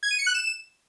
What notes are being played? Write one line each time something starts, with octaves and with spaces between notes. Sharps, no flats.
G#6
D#7
C#7
F#6
E7